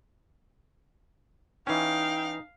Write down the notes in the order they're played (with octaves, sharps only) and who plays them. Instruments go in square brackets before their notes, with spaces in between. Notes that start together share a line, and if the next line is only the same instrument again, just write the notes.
[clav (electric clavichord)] E3 C#4 [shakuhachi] D#4 [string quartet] F5 [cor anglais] G5